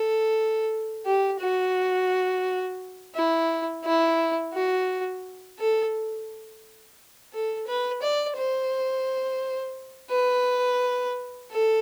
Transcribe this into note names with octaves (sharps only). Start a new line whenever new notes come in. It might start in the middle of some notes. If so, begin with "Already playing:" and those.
Already playing: A4
G4
F#4
E4
E4
F#4
A4
A4
B4
D5
C5
B4
A4